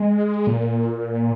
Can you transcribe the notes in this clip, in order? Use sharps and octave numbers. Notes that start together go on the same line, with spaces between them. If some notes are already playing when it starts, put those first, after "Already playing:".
Already playing: G#3
A#2